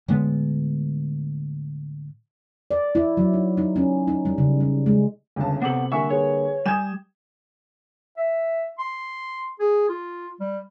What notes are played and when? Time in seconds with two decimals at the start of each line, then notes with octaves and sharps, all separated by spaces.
0.08 A2 D3 G#3 B3
2.71 D5
2.95 E4
3.17 F#3
3.33 D#4
3.57 D#4
3.76 C#4
4.08 D#4
4.25 G3
4.38 C#3
4.60 G3
4.86 G#3
5.36 G1 C#2 G2 C#3 A5
5.62 C3 B3 C4 G4 A4 F#7
5.92 D3 G3 A#3 E5 G#5 C#6
6.10 G#4 B4 C#5
6.66 G3 G#5 D#6 G6 G#6 E7
8.17 E5
8.79 C6
9.60 G#4
9.89 F4
10.40 G3